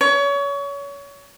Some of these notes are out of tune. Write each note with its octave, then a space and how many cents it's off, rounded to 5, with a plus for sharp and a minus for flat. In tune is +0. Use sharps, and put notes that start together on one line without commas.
C#5 +30